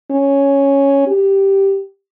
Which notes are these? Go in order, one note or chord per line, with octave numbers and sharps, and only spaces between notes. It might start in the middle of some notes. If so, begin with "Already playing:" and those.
C#4
G4